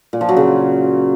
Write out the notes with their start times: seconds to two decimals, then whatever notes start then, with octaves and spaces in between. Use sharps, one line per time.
0.13 A#2
0.21 F3
0.29 F#3
0.36 C#3